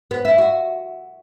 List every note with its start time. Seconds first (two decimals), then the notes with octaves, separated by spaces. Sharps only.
0.11 B3
0.25 E4
0.38 F#4